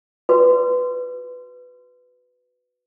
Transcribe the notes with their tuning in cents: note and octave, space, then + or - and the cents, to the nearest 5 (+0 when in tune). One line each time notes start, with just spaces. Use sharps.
F#4 -15 B4 +10